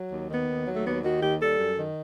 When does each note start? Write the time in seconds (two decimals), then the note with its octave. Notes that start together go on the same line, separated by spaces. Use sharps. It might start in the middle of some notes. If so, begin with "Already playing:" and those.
Already playing: F#3
0.12 D#2
0.30 D#3 B3
0.49 D#2
0.67 F#3
0.76 A3
0.85 D#2 B3
1.04 D#3 F#4
1.22 D#2 G4
1.41 G3 A4
1.59 F#2
1.78 D#3